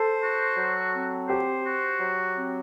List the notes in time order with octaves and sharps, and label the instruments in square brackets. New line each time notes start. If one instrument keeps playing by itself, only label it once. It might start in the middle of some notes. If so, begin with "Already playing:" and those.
Already playing: [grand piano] A4 [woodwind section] C5
[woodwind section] F#4
F#3
C4
[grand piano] G4 [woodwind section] C5
[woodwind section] F#4
F#3
C4